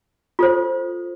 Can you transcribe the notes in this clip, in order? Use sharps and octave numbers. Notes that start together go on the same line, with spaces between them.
F4 A4 C5